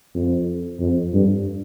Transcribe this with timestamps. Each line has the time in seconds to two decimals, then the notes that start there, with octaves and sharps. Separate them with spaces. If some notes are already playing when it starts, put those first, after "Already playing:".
0.15 F2
0.80 F2
1.13 G2